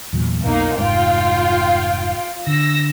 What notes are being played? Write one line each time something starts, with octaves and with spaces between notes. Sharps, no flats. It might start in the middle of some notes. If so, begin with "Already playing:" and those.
E2 A#2 F#3
B1 F2 B2 A#3 D#4
F1 G#2 F4 G5
D3 E6 A#6